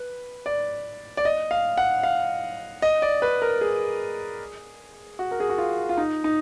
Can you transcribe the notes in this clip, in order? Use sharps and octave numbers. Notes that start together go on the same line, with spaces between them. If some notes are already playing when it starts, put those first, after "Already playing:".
Already playing: B4
D5
D5
D#5
F5
F#5
F5
D#5
D5
B4
A#4
G#4
F#4
A#4
G#4
F#4
F4
F4
D#4
D#4